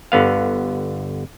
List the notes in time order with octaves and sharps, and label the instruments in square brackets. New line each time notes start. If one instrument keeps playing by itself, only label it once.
[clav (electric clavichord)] G1 D3 B3 F5